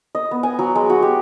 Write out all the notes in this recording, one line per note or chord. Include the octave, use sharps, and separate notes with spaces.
D#5
B3
G#5
F#3
G#3
F#4
G4